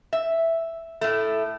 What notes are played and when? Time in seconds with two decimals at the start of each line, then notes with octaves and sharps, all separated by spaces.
0.13 E5
1.01 A2 A3